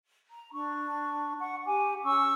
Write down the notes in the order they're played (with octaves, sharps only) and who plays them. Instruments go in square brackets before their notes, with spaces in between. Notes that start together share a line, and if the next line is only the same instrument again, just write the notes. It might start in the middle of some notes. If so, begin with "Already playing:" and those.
[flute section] A#5
D4 C#6
F#5 C#6
G4 G#5 D6
C#4 C#6 E6